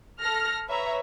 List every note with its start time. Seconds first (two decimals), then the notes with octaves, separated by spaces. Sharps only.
0.21 A4 F6 A#6
0.68 B4 C#5 E5 A#5